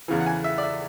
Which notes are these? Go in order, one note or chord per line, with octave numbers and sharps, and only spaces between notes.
E2 C#3 E3
F#5
G#5
E5
D5
E5